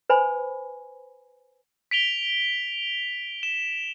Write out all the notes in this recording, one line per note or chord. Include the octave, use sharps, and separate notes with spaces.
B4 C5 G#5 B5
B6 D7 F7 G7
E7